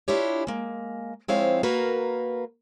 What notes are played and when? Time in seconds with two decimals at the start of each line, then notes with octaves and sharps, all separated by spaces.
0.08 D4 E4 F4 G4 C#5
0.47 G#3 A#3
1.28 F3 G#3 C4 E4 C#5 F5
1.63 A#3 F#4 A#4 B4